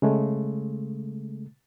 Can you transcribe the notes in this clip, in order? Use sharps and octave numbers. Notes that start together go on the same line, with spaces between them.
C#3 G#3 A3